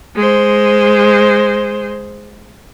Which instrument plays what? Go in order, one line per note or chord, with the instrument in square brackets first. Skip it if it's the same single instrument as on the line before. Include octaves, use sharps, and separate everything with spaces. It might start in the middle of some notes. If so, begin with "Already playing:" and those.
[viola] G#3 C5